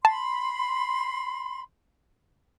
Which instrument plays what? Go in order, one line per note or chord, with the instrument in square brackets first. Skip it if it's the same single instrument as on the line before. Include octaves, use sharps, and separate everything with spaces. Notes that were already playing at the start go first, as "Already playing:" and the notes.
[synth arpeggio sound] A5 [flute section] B5 C6